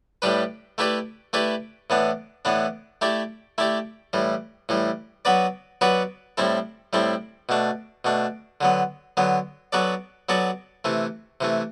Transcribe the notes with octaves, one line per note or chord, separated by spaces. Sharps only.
A2 G3 D4 G4 B4
A3 E4 G4 B4 D5
A3 E4 G4 B4 D5
A2 E3 B3 D4
A2 E3 B3 D4
A3 E4 G4 D5
A3 E4 G4 D5
A2 E3 G3
A2 E3 G3
F#3 B3 F#4 B4 D5
F#3 B3 F#4 B4 D5
A2 G3 C4 E4 A4
A2 G3 C4 E4 A4
B2 A3 D4
B2 A3 D4
D3 F#3 B3
D3 F#3 B3
F#3 B3 F#4 A4 D5
F#3 B3 F#4 A4 D5
C3 E3 A3
C3 E3 A3